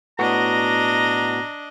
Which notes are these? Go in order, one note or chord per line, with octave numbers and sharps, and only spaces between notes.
A2 B3 D4 F#4 D#5 A#5